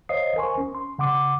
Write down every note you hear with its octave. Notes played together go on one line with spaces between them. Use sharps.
C5 C#5 D#5 F5 D#6 C7
A#4 C5 G#5 C6 C#6
C#4
C6
C#3 F#5 C6 D6